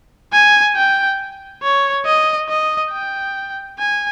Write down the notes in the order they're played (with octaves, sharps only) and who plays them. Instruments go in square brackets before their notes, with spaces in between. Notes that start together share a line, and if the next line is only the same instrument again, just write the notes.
[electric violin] G#5
G5
C#5
D#5
D#5
G5
G#5